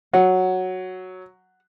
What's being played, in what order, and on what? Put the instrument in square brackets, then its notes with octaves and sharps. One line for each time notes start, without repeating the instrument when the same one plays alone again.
[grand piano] F#3 [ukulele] F#5